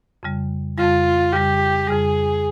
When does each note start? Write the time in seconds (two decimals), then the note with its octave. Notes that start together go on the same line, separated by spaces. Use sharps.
0.23 F2 C#3 G3
0.78 F2 C#3 G3 F4
1.32 F2 C#3 G3 G4
1.87 F2 C#3 G3 G#4